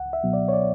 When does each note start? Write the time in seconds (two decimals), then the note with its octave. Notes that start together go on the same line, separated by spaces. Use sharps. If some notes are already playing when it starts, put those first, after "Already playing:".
Already playing: C#2 F#5
0.13 E5
0.23 B2 F#3 B3
0.33 D5
0.49 C#5
0.53 D5